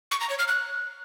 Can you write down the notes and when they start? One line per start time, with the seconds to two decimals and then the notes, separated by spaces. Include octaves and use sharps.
0.11 C#6
0.20 A#5
0.30 C#5
0.39 F6
0.48 F#6